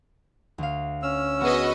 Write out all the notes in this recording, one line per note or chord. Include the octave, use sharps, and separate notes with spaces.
D2 F5
C#4 E6 F6
B3 F#4 G#4 B4 D#5